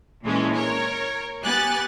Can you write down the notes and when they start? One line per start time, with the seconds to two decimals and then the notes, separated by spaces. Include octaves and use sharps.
0.23 A#2 E3 G#3 A3 C#4
0.54 A#4 C#5
1.43 B3 G4 G#5 F#6 A6